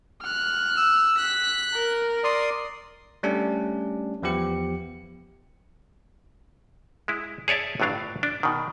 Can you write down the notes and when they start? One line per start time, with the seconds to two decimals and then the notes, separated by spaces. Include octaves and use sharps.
0.22 F6 F#6
0.77 E6
1.17 F#6 B6
1.73 A#4
2.24 D5 C6 D#6
3.23 G3 A3 C#4 D4 G4
4.23 E2 F3 B3 G4 C#7
7.08 G#3 E4
7.48 G#4 C#5 D5 E5 A5
7.80 G1 A2 F#3 D4 F5
8.23 D4
8.43 B2 D#3